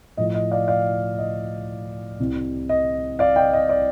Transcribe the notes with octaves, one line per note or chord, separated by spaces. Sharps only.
A2 F3 D#5
D#5
D5 F5
D5 F5
D#5
C2 C3 G3
D#5
D5 F5
D#5 G5
D#5
D5